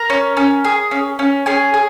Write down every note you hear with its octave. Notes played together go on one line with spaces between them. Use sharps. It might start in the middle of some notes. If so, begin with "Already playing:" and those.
Already playing: A#4 A#5
C#4
C#4
G#4
C#4
C#4
C#4 G#4 G#5
G#4